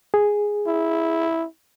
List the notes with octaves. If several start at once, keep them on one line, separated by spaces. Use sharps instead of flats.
G#4
E4